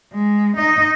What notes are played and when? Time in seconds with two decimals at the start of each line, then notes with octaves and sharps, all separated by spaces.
0.13 G#3
0.57 D#4 D#5